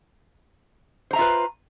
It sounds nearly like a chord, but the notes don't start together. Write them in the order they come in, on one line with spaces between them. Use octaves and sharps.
C5 A#5 E5 F4 B4